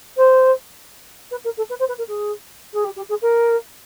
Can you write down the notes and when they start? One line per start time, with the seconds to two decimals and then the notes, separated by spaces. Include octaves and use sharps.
0.17 C5
1.31 B4
1.45 A#4
1.57 A4
1.70 B4
1.79 C5
1.88 B4
1.98 A#4
2.08 G#4
2.74 G#4
2.84 G4
2.96 G4
3.09 G#4
3.22 A#4